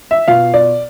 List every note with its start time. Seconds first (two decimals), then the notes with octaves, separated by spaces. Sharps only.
0.11 E5
0.28 B2 B3 F4 F5
0.54 D5